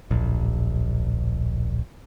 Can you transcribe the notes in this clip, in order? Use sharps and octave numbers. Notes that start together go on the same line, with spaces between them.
D1 A#1